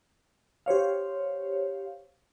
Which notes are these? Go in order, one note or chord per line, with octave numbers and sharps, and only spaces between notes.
G4 C5 C#5 F5